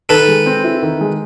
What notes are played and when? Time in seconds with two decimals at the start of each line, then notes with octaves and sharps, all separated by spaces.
0.09 D#3 A4 B4
0.28 G#3
0.46 C4
0.64 E4
0.83 D#3
1.01 G#3